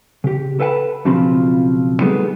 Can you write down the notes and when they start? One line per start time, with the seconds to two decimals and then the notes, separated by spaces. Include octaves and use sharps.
0.24 C#3 G4
0.60 A4 B4 F5 G5 A5 B5
1.05 B1 C#3 F3 C4 F4 B5
2.02 F#3 G3 A3 B3 D#4 G#4